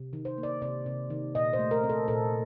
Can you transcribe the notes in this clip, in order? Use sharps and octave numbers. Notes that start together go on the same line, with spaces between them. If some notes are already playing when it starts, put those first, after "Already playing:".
Already playing: C3
D#3
C5
A#3
D5
C3 D5
C3
D#3
A#2 D#5
C5
A3
A#4
C4
A4
A#2 A4